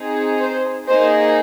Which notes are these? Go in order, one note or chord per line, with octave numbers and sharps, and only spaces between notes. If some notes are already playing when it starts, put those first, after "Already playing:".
Already playing: C4 D#4 G#4
C5
A#3 D#4 G#4 C5